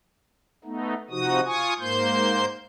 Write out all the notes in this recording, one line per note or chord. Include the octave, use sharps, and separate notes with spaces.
A3 B3 D#4
C3 F3 D#4 F#4 D#6
F4 G#5 C#6 D#6
G#2 A#3 C5 C6 G6